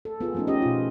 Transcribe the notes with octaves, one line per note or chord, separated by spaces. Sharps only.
A4
B3 F4 G#4
F3 A3 B3 C#4 D#4
C#4 G4 D#5
B2 F4